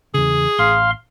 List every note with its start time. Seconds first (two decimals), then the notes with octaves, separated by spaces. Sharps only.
0.14 E2 C#3 G#4
0.59 A1 F5 C6